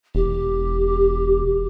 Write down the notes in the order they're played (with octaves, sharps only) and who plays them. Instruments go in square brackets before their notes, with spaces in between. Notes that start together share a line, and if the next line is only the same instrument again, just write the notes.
[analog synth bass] E1 [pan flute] G4